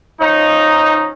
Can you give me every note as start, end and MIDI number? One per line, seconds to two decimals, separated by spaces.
0.20 1.12 53
0.20 1.12 61
0.20 1.12 63